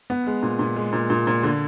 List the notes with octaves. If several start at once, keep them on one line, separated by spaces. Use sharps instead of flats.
B3
G#3
A#2
A#2
G#3
A#2
A#2
A#2
D3